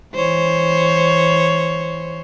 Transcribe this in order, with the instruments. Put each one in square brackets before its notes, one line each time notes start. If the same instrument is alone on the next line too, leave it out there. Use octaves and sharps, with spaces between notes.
[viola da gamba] E3 C5 C#5